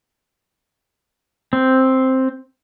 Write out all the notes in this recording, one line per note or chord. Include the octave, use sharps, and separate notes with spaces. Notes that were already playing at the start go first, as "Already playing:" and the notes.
C4